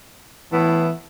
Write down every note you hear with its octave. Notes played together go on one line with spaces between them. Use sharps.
A2 E3 B3 E4